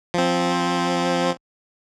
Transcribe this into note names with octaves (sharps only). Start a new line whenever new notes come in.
F3 C4